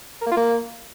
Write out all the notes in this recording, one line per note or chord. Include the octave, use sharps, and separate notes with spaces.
A#4
A#3
F4
A#3